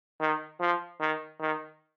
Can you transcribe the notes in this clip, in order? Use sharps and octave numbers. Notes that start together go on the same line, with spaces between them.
D#3
F3
D#3
D#3